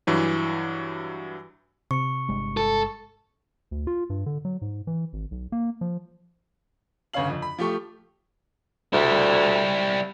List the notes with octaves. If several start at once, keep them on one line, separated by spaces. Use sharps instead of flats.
G2 E3 F#3
C3 C#6 C#7
G1 G#3
A4
D2
F4
G2
D3
F#3
G#2
E3
G#1
B1
A#3
F3
G1 C#3 C#4 C#5 F5 F#7
F2
B5
F3 A3 G4 G5 C#6
D2 G3 E4